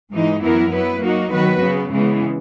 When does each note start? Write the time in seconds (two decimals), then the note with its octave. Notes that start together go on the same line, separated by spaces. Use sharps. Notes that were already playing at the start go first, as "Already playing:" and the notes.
0.11 G#2 E3 G#3 D#4
0.41 F#2 E3 B3 E4 A#4
0.71 F#3 B3 E4 B4
1.01 F#3 A#3 D#4 F#4
1.31 D#3 F#3 B3 F#4 B4
1.62 C#3 F#3 B3
1.90 C#3 E3 G#3 B3